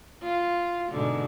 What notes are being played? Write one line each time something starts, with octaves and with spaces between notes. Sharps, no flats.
F4
G#2 B2 D3